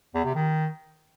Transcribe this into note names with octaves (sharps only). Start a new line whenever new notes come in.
E2
C3
D#3